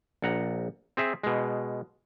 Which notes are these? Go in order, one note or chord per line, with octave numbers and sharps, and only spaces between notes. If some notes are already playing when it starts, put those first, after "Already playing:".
A#1 F#5 A#5
C4 G#4 E5
B2 G#3